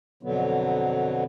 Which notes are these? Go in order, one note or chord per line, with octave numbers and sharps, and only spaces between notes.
F2 B2 D3 F#3 B3